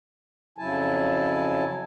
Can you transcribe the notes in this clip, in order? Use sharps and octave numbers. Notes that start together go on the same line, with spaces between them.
F2 C#3 F#3 E4 G#5 A5